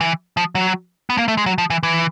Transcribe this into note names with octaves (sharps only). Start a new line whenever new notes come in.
E3
F3
F#3
B3
A#3
A3
G#3
F#3
F3
E3
E3